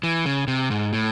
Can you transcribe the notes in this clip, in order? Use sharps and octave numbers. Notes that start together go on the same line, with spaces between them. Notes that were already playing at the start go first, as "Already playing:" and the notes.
E3
C#3
C3
G#2
A2